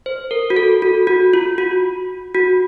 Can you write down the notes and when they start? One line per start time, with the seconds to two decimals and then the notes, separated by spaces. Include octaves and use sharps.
0.06 C5
0.31 A#4
0.50 F#4
0.56 A4
0.82 F#4
1.07 F#4
1.33 F4
1.58 F#4
2.34 F#4